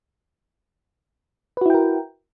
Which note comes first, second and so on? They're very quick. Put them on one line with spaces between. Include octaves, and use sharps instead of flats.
B4 F#4 E4 G5 A#4